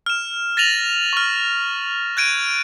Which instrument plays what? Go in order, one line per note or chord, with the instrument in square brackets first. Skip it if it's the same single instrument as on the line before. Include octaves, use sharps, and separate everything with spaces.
[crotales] F6 E7
A6 A#6 D#7 F7 F#7
C#6 F6
F#6 G#6 D7 D#7